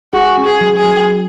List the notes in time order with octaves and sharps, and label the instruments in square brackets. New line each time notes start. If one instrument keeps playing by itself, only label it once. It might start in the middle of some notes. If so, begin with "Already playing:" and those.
[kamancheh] F#4 [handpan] G#4
[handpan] C#4
[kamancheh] G#4
[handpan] F#3
[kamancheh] G#4
[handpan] F#3